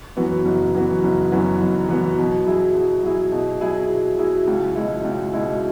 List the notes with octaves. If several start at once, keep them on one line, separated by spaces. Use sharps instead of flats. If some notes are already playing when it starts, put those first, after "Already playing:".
F#2 E3 B3 F#4
F#1
F#2 E3 B3 F#4
F#1
F#2 E3 B3 F#4
F#1
F#2 E3 B3 F#4
B2
F#3 E4 G#4
B2
F#3 E4 G#4
B2
F#3 E4 G#4
B2
F#3 E4 G#4
C#2
B2 G#3 E4
C#2
B2 G#3 E4